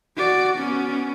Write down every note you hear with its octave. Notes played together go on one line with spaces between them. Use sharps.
F#4 D5
B3 C#4